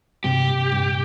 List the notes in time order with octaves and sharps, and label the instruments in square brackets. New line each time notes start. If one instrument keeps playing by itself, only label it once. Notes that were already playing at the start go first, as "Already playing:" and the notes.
[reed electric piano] G2 C3 [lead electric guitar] G4
[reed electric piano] A#2
G2